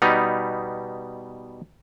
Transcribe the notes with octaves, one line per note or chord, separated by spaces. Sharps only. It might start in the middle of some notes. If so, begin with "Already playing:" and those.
B2 G3 B3 D#4